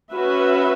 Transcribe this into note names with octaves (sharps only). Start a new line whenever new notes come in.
C#4 F#4 B4 E5